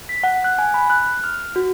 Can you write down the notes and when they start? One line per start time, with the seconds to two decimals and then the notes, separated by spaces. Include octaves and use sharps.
0.09 B6
0.23 F#5
0.44 F#6
0.59 G#5
0.74 B5
0.90 F#6
1.24 F6
1.56 F#4